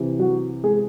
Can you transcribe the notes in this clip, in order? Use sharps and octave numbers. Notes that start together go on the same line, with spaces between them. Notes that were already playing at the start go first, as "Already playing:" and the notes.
Already playing: C3 E3
F#3 F#4
G#3 G#4